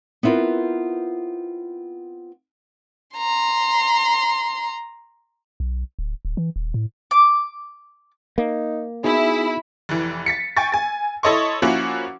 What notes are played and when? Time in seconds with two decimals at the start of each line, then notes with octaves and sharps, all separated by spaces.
0.23 B3 C4 E4 F4 A#4 B4
3.16 A#5 C6
5.60 B1
5.99 D1
6.25 D1
6.37 E3
6.56 D#1
6.74 A2
7.11 D6
8.38 A#3 D#4
9.04 B3 D#4 E4 F#4 G#4
9.89 F1 E3
10.26 A6 B6 C#7
10.57 G5 G#5 C#6 A6
10.72 G#5 A6
11.23 E4 A4 C#5 D#5 C6 C#6
11.62 F3 A#3 C#4 E4 F#4